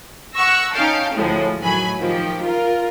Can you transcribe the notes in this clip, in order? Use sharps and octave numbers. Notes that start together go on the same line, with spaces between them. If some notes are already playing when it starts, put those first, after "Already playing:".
F#5 C#6 E6 A#6
C#4 D#4 F5 G5 A5
D2 A2 F3 G#3
A2 D#3 F#3 G#5 B5
D#3 F3 G4
F4 A#4